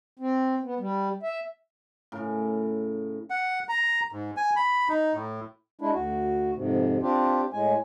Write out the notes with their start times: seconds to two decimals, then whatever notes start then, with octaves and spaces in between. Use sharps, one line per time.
0.19 C4
0.63 B3
0.79 G3
1.23 E5
2.12 A2 C#3 A#4
3.30 F#5
3.69 A#5
4.12 G#2
4.37 G#5
4.56 B5
4.89 D#4
5.14 A2
5.81 G#3 D4 E4
5.93 D2 F#4
6.55 F2 G#2 C3
7.02 C4 D4 F4 G4
7.53 A2 G#3 G#5